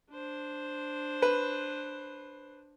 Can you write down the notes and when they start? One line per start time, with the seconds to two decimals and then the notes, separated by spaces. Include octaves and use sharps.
0.12 D4 C5
1.22 B4